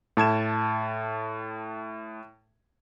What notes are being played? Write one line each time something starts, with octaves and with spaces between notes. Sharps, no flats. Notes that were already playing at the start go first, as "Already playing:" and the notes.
A2 A5 G#6 E7